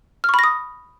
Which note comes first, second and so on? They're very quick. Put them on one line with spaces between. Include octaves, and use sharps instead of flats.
F6 C#6 B5 A#6 D#6